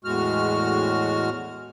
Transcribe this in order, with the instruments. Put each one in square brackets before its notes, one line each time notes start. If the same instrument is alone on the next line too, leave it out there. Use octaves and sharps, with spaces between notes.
[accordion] E2 A2 G#3 F#4 F6